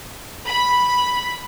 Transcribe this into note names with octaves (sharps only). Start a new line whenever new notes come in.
B5